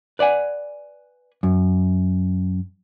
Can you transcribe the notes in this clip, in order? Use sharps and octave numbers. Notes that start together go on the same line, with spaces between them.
B4 D5 F#5 G#5
F#2